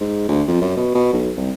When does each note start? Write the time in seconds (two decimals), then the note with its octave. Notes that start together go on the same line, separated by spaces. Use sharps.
0.01 G#2
0.28 D2
0.48 F2
0.61 F#2
0.77 B2
0.95 B2
1.13 B1
1.37 C2